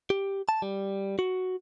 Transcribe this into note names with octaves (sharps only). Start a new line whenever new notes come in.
G4
A5
G3
F#4